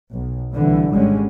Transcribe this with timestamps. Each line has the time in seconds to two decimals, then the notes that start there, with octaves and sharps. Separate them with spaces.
0.10 B1
0.54 C2 D3 E3
0.94 G#1 D3 G3 G#3 C#4